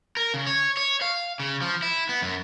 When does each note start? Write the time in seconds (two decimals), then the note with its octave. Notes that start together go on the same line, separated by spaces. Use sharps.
0.17 A#4
0.34 C#3
0.47 C#5
0.77 C#5
1.02 F5
1.40 C#3
1.62 F3
1.82 E4
2.09 B3
2.22 F#2